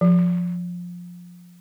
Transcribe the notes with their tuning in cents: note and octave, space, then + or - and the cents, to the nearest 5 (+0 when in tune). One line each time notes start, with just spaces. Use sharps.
F3 +15